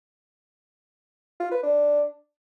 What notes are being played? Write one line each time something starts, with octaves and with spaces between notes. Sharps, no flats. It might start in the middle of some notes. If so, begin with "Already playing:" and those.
F4
B4
D4